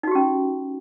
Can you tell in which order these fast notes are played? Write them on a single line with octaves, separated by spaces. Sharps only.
D#4 F#4 G4 C#4